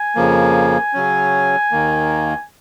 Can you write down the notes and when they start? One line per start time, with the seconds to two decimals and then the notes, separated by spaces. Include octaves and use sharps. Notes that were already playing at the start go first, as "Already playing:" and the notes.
Already playing: G#5
0.15 F2 C#3 F3 A#3
0.93 C#3 F#3 C#4
1.71 D#2 D#3 A#3